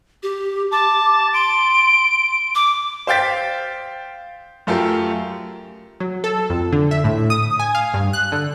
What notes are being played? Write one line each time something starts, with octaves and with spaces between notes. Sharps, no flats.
G4
A5 D6
C6 D7
D6
C5 F5 G5 A6 B6
F#2 A3 F4 G4 A#4
F#3
A4
F2
D3
E5
A2
D#6
G#5
F5
G2
F#6
D3